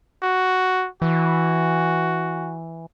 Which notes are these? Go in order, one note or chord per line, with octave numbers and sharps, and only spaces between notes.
F#4
E3 F#4